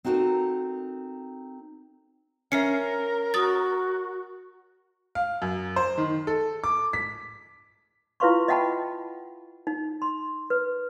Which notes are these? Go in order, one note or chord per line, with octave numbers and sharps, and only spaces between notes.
C4 D#4 F#4 A4 A#4
C#4 A#4 E5 C7 C#7
F#4 D#6 A6
F5
F#2
C5
D#3
A4
D6
B6
E4 F4 B4 F5 C6 C#6
D#5 E5 F#5 G5 A5 B5
D#4
C6
B4